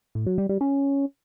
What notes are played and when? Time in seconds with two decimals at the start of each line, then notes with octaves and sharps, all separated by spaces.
0.15 A2
0.27 F#3
0.38 G3
0.49 G3
0.61 C#4